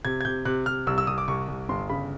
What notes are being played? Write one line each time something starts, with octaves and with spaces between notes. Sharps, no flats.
C3 G#6
G#6
C3 G6
C3 F#6
C3 F6
C2 E6
E6
C2 D#6
D6
C2 C#6
C2
G1 C6
C#3 B5